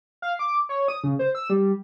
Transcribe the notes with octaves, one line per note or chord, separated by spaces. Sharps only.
F5
D6
C#5
D#6
C#3
C5
E6
G3